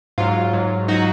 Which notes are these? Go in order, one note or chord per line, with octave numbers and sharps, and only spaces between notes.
G#2 F#3 F4
G#2 F#3
F#3 D#4 F#4